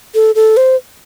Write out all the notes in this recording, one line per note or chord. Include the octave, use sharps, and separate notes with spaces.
A4
A4
C5